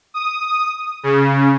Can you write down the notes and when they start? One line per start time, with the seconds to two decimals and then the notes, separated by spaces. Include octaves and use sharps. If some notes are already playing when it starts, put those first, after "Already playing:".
0.14 D#6
1.03 C#3